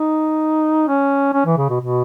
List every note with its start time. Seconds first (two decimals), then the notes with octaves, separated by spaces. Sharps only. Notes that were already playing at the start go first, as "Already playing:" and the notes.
Already playing: D#4
0.88 C#4
1.34 C#4
1.46 E3
1.58 C#3
1.70 B2
1.81 B2